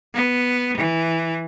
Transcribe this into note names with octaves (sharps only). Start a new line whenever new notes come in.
B3
E3